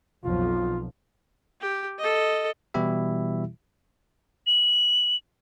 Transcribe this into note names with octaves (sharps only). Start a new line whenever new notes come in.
B1 F2 F3 F4
G4
A4 D#5
B2 E3 G3 E4 G4 E5
F#7